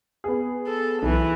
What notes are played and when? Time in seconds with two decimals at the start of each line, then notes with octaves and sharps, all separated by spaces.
0.24 B3 G#4
0.67 A4
1.03 B1 E3